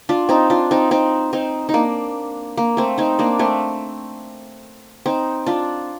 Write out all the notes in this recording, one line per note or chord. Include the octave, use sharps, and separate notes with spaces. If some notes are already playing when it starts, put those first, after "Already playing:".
D4 F4
C4 D#4
D4 F4
C4 D#4
C4 D#4
C4 D#4
D#4
A#3 D4
A#3
A3 C4
C4 D#4
A#3 D4
A3 C4
C4 D#4
D4 F4